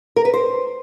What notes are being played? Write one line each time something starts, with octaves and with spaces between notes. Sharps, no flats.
A#4
B4
C5